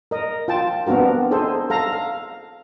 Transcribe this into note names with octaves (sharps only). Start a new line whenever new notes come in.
A#4 D#5
F4 G5 A5
B3 C4 D4 F#4 A#4
D#4 G#4 A4 C5
A4 F5 A#5
F5